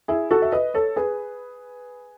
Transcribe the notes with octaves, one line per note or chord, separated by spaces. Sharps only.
E4 G#4
F#4 A4
E5
B4 D#5
A4 C#5
G#4 B4